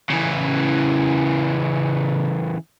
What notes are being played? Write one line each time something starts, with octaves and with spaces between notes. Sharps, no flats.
C#3 E3